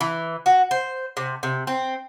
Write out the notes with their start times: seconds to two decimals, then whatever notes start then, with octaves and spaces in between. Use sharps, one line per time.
0.01 E3
0.46 F#4
0.71 C5
1.17 C3
1.43 C3
1.67 C4